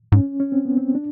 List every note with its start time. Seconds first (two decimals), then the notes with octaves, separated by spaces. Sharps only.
0.12 G#2 C#4
0.40 C#4
0.52 C4
0.65 B3
0.77 C4
0.95 D4